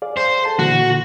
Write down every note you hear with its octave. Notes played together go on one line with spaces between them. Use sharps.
G#4 D5 F5
C5
A4 A5
A#2 D3 E3 F#4